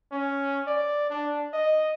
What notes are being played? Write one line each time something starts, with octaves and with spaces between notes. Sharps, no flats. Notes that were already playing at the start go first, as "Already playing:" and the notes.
C#4
D5
D4
D#5